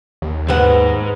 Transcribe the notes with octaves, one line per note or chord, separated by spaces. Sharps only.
D#2
C#2 G#2 B3 B4 C5 F#5